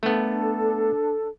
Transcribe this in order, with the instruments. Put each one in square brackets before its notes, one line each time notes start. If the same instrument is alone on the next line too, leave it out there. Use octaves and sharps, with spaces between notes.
[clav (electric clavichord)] A3 B3 [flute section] D4 A4